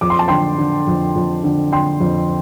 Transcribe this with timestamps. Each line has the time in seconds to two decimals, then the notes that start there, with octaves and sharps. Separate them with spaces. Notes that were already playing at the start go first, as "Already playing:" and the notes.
0.01 F2 D6
0.10 C6
0.19 A5
0.28 D3 G5 C6
0.58 D3
0.87 F2
1.15 F2
1.44 D3
1.72 D3 G5 C6
2.00 F2